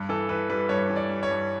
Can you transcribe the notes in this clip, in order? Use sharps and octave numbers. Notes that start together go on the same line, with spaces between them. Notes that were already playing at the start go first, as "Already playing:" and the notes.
Already playing: G2
E3 A4
E3 B4
G3 B4
G2 C#5
E3
D5
G3
C#5
G2